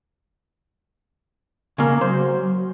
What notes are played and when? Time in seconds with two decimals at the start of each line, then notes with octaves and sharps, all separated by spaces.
1.78 C#3 A#3
2.01 F#3 C5